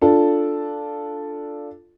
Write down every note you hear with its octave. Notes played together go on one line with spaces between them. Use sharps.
D4 F4 A4